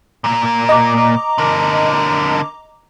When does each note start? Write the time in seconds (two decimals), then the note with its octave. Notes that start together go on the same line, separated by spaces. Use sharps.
0.24 A#2 A#3
0.69 D#5 A#5 D6
1.38 D3 A#4